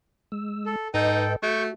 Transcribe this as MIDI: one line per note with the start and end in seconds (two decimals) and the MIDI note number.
0.32 0.76 56
0.32 0.76 88
0.66 0.88 69
0.94 1.36 44
0.94 1.25 63
0.94 1.33 69
0.94 1.36 71
0.94 1.36 75
0.94 1.33 79
1.43 1.68 57
1.43 1.74 66
1.43 1.63 85
1.43 1.63 91